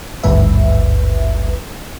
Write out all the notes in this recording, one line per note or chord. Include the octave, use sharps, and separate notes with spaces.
G#1 D2 G2 B4 E5